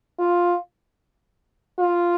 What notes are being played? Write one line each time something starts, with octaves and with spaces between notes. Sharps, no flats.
F4
F4